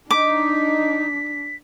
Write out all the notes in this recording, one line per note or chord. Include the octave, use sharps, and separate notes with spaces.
D4 D#4 D6 B6